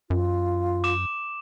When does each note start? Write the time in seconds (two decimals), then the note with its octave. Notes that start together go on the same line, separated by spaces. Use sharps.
0.10 F#2 F4
0.84 D6 E7